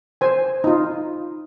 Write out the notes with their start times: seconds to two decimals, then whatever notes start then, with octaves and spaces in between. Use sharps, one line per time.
0.21 C5 G#5
0.64 D#4 F4